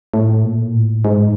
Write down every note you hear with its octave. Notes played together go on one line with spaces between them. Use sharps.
A2
A#2
A2
G#2